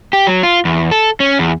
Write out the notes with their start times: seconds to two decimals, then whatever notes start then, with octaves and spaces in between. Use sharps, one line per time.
0.13 G4
0.27 F#3
0.43 F4
0.65 E2
0.91 A4
1.20 C#4
1.39 E2